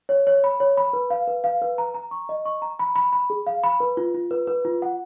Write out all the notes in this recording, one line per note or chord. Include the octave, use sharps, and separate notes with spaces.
C#5
C#5
B5
C#5
B5
B4
F5
B4
F5
B4
A#5
A#5
C#6
D#5
C#6
A#5
B5
B5
B5
G#4
F5
B5
B4
F4
F4
B4
B4
F4
F#5